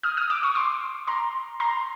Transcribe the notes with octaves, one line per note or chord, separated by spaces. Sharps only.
D#6 F6
D#6 F6
D6 E6
C#6 D#6
C6 D6
A#5 C6
A#5 C6